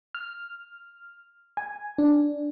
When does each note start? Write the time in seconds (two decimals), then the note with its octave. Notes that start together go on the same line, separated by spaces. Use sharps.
0.15 F6
1.57 G#5
1.98 D4